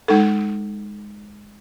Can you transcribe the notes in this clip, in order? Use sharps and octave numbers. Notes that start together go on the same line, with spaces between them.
G#3 D#4 A4